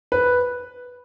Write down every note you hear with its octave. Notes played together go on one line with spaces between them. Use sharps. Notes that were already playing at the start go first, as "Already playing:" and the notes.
B4